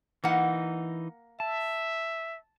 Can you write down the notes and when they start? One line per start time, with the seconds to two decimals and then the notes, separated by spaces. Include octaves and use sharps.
0.24 E3 A#3 D#4 F#5
1.40 E5 A5